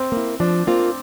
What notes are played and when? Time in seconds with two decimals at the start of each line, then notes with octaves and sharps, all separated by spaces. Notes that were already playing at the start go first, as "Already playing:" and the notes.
Already playing: C4
0.12 A#3 E4
0.40 F3 D4
0.67 A#3 C4 F4